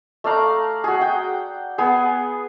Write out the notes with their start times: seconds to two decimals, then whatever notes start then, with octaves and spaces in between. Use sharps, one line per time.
0.24 A3 D5 F5 A#5
0.84 F#4 G#4
1.00 F#5 G5
1.78 B3 G#4